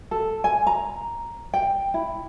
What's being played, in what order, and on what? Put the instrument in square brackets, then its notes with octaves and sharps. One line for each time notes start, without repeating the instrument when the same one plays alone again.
[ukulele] A4
G#5
A#5
G5
E4